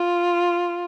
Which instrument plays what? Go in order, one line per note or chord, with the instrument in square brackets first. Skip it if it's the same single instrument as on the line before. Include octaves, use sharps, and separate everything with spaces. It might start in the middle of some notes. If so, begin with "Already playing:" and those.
Already playing: [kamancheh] F4